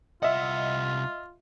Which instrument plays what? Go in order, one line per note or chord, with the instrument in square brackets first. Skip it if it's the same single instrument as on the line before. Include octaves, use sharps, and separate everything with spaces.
[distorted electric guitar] C2 F#5 [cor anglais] F4 [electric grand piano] D#5 E5